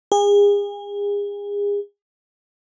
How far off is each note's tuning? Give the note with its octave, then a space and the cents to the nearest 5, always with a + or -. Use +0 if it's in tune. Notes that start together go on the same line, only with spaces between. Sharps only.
G#4 -35